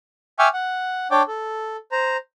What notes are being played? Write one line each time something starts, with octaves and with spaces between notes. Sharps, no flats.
E5 G5 G#5 C#6 D6 F6
F#5
D4 C#5 D5 G5 D6
A4
C5 A#5